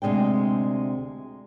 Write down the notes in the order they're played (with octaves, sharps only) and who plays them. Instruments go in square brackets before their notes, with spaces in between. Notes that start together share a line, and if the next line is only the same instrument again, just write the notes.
[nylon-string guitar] D2 C3 G#3 D4 G5